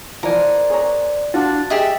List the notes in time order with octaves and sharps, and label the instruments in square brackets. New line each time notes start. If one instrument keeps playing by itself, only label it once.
[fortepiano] E3 F3 [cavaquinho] A#4 [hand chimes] C5 D5
[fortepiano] G#4 C#5 A#5
[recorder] D4 [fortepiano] F4 F#4 [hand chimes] A6
[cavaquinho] G4 G#4 D#5 [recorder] E5